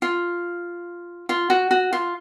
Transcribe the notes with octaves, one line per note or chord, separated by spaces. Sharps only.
F4
F4
F#4
F#4
F4